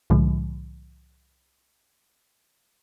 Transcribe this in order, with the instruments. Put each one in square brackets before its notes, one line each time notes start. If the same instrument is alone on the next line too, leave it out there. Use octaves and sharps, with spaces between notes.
[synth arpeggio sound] C2 A2 D3 F3 G#3